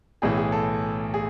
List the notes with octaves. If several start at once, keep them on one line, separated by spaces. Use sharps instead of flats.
B1 A2 E3 G#4
G#4
A4
G#4